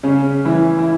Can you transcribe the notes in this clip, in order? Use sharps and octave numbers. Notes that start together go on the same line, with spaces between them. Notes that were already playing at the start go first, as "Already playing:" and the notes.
C#3 C#4
E3 E4
E4